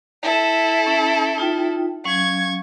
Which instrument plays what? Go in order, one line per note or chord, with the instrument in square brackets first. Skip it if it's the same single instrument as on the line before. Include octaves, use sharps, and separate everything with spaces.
[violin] E4 A4
[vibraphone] C#4
D#4 F4 G5
[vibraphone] F#3 C#4 F5 [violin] C#6 G#6